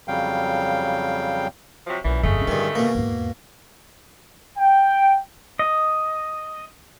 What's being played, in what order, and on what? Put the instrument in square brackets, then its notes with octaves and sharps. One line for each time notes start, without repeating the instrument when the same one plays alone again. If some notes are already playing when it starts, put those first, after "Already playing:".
[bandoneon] F2 C#3 F#3 G3 F5 G5
[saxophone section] C3 F3 F#3
[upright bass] B1 [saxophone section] F#2 A#2 E3
[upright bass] G1 F2 [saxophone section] C#3 G#3 A3
[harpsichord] G2 D#3 [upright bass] D3 F4
[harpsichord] B2 A#3
[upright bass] E2 G#2
[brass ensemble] G5
[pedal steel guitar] D#5